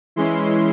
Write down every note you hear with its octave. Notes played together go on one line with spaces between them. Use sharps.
E3 G#3 C#4 E4 C6